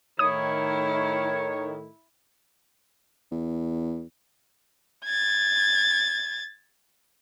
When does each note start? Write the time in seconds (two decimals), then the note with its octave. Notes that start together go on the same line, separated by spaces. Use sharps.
0.19 A2 D#3 E4 C#5 D#6
3.31 E2
5.05 G#6 A6